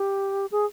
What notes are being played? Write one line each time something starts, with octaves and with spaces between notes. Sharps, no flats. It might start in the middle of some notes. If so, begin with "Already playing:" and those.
Already playing: G4
G#4